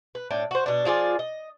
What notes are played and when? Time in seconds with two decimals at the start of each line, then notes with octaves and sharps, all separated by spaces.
0.15 B4
0.31 A2 D4 G5
0.51 F#4 C5
0.66 B2 D4
0.85 F3 F4 G#4 D5
1.19 D#5